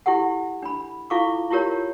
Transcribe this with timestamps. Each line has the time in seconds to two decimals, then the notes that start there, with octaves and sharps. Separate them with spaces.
0.06 E4 G4 A4 F#5
0.62 D4 B5
1.10 E4 F4 A4 F5 C#6 D6
1.51 E4 F4 G4 A#4 C#5